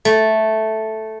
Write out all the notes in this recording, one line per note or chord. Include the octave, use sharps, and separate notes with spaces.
A3